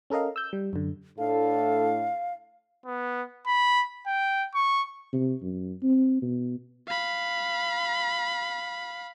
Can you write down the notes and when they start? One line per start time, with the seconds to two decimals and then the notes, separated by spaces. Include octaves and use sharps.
0.10 C#4 A4 A#4 D#5 F5
0.36 E6 G6
0.53 G3
0.73 F#2 D3
1.18 A2 D4 A4 F5
2.86 B3
3.47 B5
4.07 G5
4.54 C#6
5.13 C3
5.42 F#2
5.83 C4
6.22 B2
6.87 F5 B5